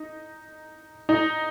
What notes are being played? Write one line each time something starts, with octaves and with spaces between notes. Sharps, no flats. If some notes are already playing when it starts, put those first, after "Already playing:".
Already playing: D#4
D#4